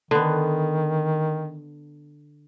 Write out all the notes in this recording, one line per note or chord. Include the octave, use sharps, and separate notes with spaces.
D3 D#3 B3